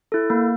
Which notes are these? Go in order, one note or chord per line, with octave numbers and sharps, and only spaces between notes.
E4 A4
A#3